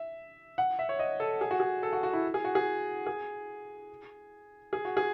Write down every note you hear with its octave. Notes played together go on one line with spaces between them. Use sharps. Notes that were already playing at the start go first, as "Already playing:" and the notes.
Already playing: E5
F#5
E5
C#5
D#5
A4
G#4
F#4
G#4
A4
F#4
F#4
E4
G#4
F#4
G#4
G#4
G#4
F#4
G#4